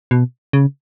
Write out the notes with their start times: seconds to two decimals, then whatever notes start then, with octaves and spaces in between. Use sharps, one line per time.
0.11 B2
0.53 C#3